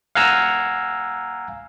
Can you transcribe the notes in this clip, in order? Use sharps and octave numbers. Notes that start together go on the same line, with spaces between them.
F5 F#5 G#5 A#5 E6